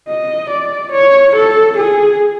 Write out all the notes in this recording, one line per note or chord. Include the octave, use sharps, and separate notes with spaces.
D#5
D5
C#5
A4
G#4